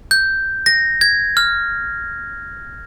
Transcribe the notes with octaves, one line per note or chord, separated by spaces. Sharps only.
G6
A#6
G#6
F6